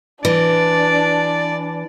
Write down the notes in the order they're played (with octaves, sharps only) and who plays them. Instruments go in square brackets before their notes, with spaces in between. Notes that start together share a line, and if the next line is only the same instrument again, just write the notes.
[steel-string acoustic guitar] E3 [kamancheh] D4 [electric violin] D5